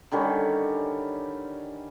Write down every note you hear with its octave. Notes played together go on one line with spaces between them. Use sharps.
D3 D#3 G3 C#4